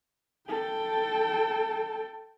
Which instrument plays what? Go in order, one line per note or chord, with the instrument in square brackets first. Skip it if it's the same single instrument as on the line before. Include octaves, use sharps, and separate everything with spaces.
[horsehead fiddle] A4 G5